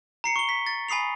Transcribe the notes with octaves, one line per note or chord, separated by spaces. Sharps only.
A#5 C7 C#7
C#6 G7
B6
A6
G#5 B5 D#6 C7 F7